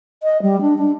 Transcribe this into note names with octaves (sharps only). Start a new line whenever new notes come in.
D#5
G3
D4
D4